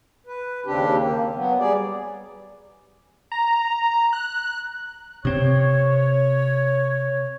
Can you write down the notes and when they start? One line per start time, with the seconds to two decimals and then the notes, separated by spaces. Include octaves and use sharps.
0.26 B4
0.66 D#2 C#3 C4 D4 G4
0.99 A#3
1.35 F#3 B3
1.58 G3 G#4 D5
3.32 A#5
4.13 F#6
5.25 C3 C4 C#5